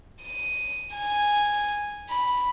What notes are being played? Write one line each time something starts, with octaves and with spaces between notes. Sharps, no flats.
D#7
G#5
B5